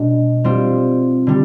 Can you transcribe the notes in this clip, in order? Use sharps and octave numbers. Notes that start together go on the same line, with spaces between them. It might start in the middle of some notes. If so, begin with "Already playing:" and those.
Already playing: B2 G#3 D4
G3 C4 F4
D3 G3